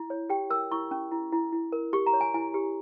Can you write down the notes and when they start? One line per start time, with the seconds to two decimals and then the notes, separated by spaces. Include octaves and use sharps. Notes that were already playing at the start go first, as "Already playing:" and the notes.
Already playing: E4
0.10 C#5
0.30 G4 G5
0.50 A#4 E6
0.71 E4 C#6
0.91 C#4
1.11 E4
1.32 E4
1.52 E4
1.72 A#4
1.93 G4 C#6
2.06 A#5
2.13 C#5
2.21 G#5
2.34 E4 G#5
2.54 G4